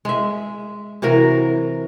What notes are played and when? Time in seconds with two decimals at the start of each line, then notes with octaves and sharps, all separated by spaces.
0.05 G#3 E5
1.02 C3 E3 F#3 A#4